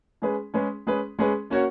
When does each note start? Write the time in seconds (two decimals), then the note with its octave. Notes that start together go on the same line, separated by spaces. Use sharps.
0.22 G#3 C#4 G#4 B4
0.54 G#3 C#4 G#4 B4
0.87 G#3 C#4 G#4 B4
1.19 G#3 C#4 G#4 B4
1.50 A#3 C#4 F#4 C#5